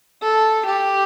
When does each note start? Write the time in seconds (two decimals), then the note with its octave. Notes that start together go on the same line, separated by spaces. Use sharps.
0.22 A4
0.65 G4